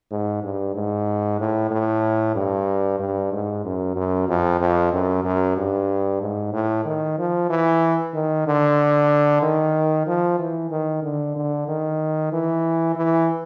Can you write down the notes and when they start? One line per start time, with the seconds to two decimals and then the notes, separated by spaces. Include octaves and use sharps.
0.11 G#2
0.43 G2
0.75 G#2
1.40 A2
1.71 A2
2.35 G2
3.00 G2
3.32 G#2
3.65 F#2
3.96 F#2
4.28 F2
4.60 F2
4.93 F#2
5.24 F#2
5.57 G2
6.21 G#2
6.53 A2
6.85 D#3
7.18 F3
7.50 E3
8.14 D#3
8.47 D3
9.42 D#3
10.07 F3
10.39 E3
10.71 D#3
11.03 D3
11.36 D3
11.68 D#3
12.33 E3
12.96 E3